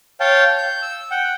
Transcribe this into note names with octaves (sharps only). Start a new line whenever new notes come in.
C#5 F5 G5 A5
G6
E6
F#5 G5